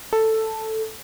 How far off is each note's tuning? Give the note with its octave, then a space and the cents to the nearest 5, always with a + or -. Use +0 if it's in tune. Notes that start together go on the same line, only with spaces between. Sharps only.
A4 +5